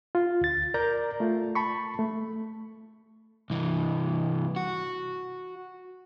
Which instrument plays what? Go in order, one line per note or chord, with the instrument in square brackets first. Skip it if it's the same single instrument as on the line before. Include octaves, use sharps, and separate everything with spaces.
[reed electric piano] F4
D2 A6
A#4 D5 A#5 G6
A3 F4
A5 B5 C#6
A3
[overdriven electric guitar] C2 E3
F#4